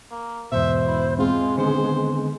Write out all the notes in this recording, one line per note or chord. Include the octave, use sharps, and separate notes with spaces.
A#3
E2 G#2 B2 C5 E5
E4
G#3 C4 F4
D3 D#3 B3 C5